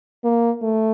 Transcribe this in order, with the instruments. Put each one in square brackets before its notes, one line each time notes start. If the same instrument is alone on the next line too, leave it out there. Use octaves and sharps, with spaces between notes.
[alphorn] A#3
A3